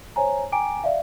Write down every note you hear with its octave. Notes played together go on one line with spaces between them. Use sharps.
C5 C#5 G#5 A#5
G5 G#5 A#5 D6 D7
D5 E5 F5